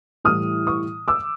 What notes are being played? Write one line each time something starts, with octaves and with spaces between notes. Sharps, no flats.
A2 E3 G3 D#6 F6
C#6 D#6
D6 E6